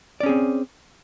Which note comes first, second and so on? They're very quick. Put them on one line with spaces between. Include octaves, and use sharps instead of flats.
D5 C#4 G#4 C4